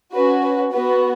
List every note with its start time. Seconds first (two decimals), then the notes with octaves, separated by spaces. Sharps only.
0.13 C#4 F#4 B4
0.43 B4
0.73 B3 F#4 B4